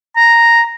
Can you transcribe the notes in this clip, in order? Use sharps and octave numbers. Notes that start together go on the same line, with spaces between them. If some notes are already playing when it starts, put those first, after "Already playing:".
A#5